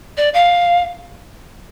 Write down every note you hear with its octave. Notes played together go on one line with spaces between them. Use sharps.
D5
F5